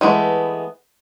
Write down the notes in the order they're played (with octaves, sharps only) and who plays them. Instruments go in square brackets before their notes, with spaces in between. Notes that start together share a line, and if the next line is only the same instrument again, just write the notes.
[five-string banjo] E3 G#3 A3 B3